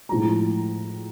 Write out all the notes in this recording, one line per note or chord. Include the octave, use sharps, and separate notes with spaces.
A2 F3 G#3 A#5